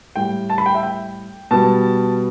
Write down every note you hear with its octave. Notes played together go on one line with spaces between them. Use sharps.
A2 G3 G5
A5
B5
G5
E5
G5
B2 G3 A5